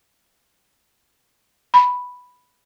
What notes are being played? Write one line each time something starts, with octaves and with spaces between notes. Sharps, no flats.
B5